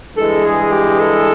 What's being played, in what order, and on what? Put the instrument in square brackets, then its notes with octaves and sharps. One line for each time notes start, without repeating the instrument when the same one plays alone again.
[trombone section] G2 E3 G#3 [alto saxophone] A4
[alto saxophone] G#4
G4
A4